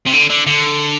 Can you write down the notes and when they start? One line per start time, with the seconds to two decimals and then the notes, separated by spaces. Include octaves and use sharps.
0.07 C3
0.14 D3
0.30 D3
0.47 D3